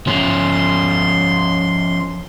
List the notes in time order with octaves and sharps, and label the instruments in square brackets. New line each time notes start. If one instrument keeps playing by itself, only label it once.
[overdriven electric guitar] F3 C#4 [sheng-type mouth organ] C6